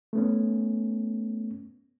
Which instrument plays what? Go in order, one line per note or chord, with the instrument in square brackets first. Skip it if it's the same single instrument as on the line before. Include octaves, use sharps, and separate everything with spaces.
[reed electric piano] A3 B3 C#4